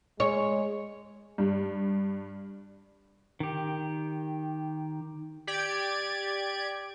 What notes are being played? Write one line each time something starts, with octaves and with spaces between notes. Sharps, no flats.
G#3 C#5
G2
D#3 G4
G4 D5 G#6 D7